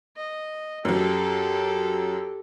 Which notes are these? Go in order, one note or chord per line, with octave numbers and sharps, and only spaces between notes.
D#5
F#2 F#3 G4 A4